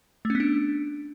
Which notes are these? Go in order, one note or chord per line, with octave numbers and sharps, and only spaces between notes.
A3
C#4
B3
D4